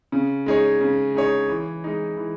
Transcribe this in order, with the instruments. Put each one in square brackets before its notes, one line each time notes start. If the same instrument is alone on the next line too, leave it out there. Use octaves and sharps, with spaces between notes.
[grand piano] C#3
G#3 D#4 G#4 C#5
C#3
G#3 D#4 G#4 C#5
E3
G#3 D#4
E3